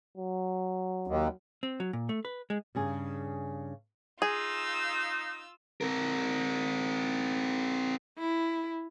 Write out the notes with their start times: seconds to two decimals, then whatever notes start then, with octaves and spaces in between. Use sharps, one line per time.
0.17 F#3
1.07 D#2
1.63 C4
1.80 F#3
1.93 A#2
2.09 A3
2.25 B4
2.50 G#3
2.75 G2 C#3 G#4
4.22 D#4 F4 G#4 E6
5.81 C4 A#4
8.19 E4